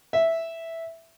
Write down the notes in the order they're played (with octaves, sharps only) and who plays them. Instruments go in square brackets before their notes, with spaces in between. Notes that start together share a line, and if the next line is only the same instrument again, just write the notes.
[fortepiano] E5